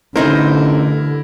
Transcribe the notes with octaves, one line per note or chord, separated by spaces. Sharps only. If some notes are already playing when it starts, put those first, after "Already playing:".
A1 D3 C4 D#4 E4 A#4 C5